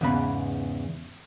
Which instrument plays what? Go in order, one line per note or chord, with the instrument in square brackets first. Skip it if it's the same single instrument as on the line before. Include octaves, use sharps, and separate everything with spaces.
[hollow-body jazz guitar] E2 G#2 C#3 B3 B5